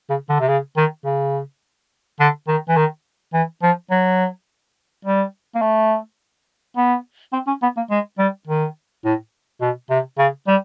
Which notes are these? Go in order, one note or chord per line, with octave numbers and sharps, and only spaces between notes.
C#3
D3
C3
C#3
D#3
C#3
D3
D#3
E3
D#3
E3
F3
F#3
G3
A#3
A3
B3
C4
C#4
B3
A#3
G#3
G3
D#3
A2
B2
C3
C#3
G3